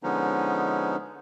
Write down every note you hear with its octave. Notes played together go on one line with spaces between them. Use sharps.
D3 F3 G#3 B3 C#4 D#4